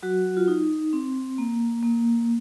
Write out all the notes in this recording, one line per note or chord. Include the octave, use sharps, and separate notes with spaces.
F#3 F#4
F4
D#4
C4
A#3
A#3